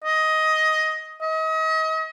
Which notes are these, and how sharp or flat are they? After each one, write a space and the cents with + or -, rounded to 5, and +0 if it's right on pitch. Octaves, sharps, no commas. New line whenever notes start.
D#5 +10
D#5 +35